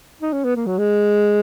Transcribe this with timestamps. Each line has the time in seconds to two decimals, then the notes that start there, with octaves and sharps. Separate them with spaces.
0.21 D#4
0.33 C#4
0.44 B3
0.55 A#3
0.66 F#3
0.78 G#3